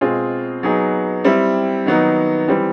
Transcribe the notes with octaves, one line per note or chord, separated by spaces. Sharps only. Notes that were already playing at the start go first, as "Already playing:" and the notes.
B2 G#3 C4 F4 G#4
F#3 B3 D#4 G#4
G3 C4 E4
D#3 F#3 B3 D#4
E3 G3 C4